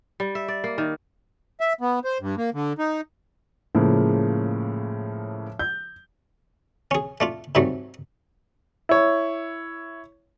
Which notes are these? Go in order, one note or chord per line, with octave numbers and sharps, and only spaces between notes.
G3
E5
D5
A#3
D#3
E5
B3
C5
G2
A#3
D3
D#4
A2 C#3 F3 G#3 A#3
G6
C#4 G#4
A3 D4 F4
G#2 C3 D#3 F#3 G3 A3
E4 C#5